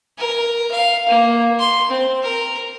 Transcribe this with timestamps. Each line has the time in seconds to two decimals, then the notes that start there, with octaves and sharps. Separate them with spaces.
0.18 A#4
0.71 F5
1.09 A#3
1.59 C6
1.90 C4
2.22 A#4